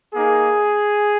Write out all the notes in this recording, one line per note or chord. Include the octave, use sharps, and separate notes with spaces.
A#3 D#4 G#4